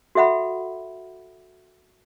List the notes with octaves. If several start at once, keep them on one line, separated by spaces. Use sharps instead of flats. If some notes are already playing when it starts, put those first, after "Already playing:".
F#4 A4 E5 F#5 B5